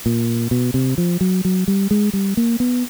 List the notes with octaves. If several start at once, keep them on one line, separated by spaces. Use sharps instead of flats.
A#2
B2
C3
F3
F#3
F#3
G3
G#3
G3
A#3
B3